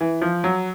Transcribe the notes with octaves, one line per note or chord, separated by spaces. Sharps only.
E3
F3
F#3